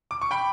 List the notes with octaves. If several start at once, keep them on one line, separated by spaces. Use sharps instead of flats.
D6
C#6
G5 B5